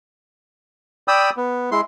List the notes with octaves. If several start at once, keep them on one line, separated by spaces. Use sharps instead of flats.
D5 G5 B5 D#6 E6
B3
G#3 E4 C6